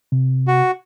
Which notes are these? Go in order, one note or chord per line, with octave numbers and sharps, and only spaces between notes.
C3
F#4